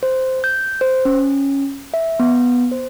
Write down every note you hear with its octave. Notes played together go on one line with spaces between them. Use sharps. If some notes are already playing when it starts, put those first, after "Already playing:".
C5
G6
C5
C#4
E5
B3
C5